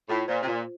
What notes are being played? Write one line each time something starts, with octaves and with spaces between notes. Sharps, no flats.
A2 F4
A#2 C5
C3
A#2 F4